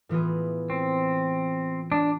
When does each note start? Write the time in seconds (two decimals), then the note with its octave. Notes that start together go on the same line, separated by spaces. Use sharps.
0.09 A2 E3 B3 F4 G#4
0.70 C4
1.92 D4